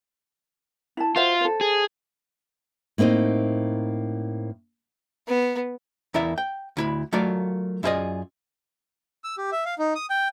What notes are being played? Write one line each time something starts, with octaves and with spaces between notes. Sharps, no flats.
E4 A5
F4 F#4 C5 E5
A4 C5
G#4
A2 A#3 C4 D#4 C5
B3
E2 E4 A#4 D5 E5
G5
D2 E4 B5
F#3 A3 F4 A#4 D5
F#2 E4 F4 G#4 D5 D#5
E6
G4
E5
F5
D#4
D#6
G5